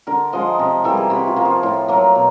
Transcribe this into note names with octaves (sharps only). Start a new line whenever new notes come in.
D3 A#4
F3 G#3 D#5
C3 D#5
E3 G3 A#3 A4
G#4
C3 F#4
F4
F3 A#3
F4
A2
F#3 A#3
B2